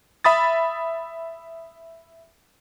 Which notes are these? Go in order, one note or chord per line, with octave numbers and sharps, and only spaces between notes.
E5 B5 D#6 A6